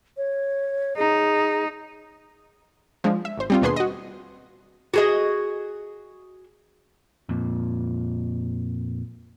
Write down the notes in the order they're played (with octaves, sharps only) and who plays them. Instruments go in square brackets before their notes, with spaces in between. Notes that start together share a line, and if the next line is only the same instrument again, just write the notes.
[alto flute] C#5
[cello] D#4 [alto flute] G#4
[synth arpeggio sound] F3 G#3 D4
E5
G#1 C5
G3 C4 F4
D#2 B2 D4 G#4 B4 C6
F#4 D#5
[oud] F#4 G#4 D#5
[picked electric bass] F2 A#2